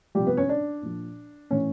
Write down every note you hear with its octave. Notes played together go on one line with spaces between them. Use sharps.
C3 F3 G3 G4
B3 B4
C#4 C#5
D4 D5
A#2 F3
A2 E3 C#4 C#5